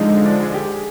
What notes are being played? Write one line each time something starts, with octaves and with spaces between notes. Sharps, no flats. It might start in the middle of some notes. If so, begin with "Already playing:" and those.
Already playing: D3 F3 G#3 D#4
D4
G#4
G4
G#4